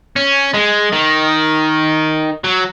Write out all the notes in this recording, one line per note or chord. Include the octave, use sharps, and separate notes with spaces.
C#4
G#3
D#3
F#3